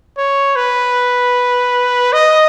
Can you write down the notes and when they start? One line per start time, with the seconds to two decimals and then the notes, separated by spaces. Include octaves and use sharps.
0.17 C#5
0.56 B4
2.13 D#5